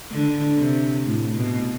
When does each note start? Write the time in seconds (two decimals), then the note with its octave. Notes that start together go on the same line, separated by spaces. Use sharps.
0.11 D3
0.58 C3
1.06 A2
1.36 B2